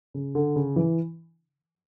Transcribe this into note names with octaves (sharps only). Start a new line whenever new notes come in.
C#3
D3
C#3
E3